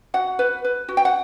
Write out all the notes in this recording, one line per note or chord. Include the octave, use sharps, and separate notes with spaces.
F#4 F#5
B4
B4
F#4
G5
F#5